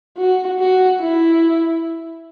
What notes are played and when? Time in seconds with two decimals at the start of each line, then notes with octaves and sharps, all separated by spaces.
0.17 F#4
0.59 F#4
1.01 E4